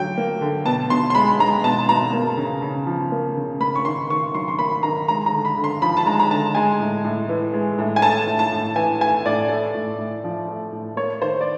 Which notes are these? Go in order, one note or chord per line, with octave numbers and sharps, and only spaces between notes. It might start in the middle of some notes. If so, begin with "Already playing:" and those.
Already playing: D3 F#3 G5
A#3
D3
B2 A5
B2 C6
C6
G#3 B5
G#3 A#5
B2 A5
B2 A#5
A#3
C#3
C#3
F3
A#3
C#3
A#3 B5
C#6
D#3 C6
D#3 C#6
F#3 C6
C6
A#3 B5
D#3 A#5
G#3 A#5
A#5
D3
B5
D3
C6
F3 B5
A5
G#3 A#5
A#5
D3 A5
G#3 G#5
A2
A2
E3
G#3
A2
G#5
A3 A5
A2
A5
A2
E3 G#5
A3 G#5
A2 D5
A3
A2
A2
F3
A3
A2
A#3 C#5
D#3 C5
D5